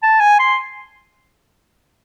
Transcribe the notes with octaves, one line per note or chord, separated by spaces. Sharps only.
A5
G#5
C6